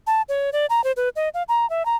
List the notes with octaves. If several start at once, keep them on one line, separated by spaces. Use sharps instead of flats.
A5
C#5
D5
A#5
C5
B4
D#5
F5
A#5
E5
A#5